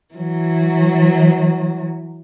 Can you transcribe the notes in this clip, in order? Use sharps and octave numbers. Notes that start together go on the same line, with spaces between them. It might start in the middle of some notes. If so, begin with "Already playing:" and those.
E3 F#3